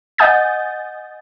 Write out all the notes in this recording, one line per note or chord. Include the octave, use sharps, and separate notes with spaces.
D#5 F#5 G#5 D#6 G6 A6